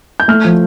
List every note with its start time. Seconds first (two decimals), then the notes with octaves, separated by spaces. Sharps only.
0.20 G6
0.28 A3 F6
0.45 F3